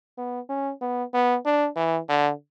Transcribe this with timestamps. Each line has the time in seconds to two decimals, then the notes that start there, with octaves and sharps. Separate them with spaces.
0.18 B3
0.49 C#4
0.81 B3
1.14 B3
1.46 D4
1.76 E3
2.09 D3